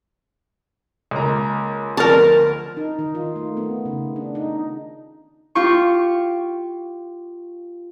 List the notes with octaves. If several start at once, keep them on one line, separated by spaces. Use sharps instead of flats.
C#2 A#3 A#5
D2 F3 B3 A#4 A5
D#4
D#3
F4
A3
B3
C#3
D4
D#4
F4 G4 C#6